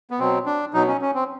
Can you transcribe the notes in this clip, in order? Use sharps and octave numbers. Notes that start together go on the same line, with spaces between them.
B3
B2 F#3 C4
D4
B2 F#3 D#4
C#4
C#4
C4